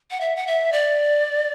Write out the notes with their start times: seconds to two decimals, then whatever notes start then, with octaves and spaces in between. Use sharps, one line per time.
0.11 F#5
0.21 E5
0.36 F#5
0.47 E5
0.72 D5